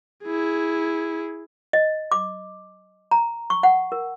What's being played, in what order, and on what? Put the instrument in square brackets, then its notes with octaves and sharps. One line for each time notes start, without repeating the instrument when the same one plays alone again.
[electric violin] E4 G#4
[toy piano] D#5
D6
A#5
C#6
F#5
A#4